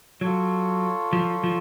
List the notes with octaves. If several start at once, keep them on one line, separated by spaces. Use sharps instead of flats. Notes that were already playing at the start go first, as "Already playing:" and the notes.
F#3 F4 A4 C#5
F3
F3